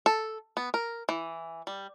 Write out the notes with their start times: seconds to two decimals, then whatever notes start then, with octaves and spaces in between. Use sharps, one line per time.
0.06 A4
0.57 B3
0.74 A#4
1.09 E3
1.67 G3